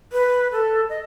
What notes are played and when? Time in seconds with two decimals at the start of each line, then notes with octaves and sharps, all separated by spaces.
0.13 B4
0.52 A4
0.89 D#5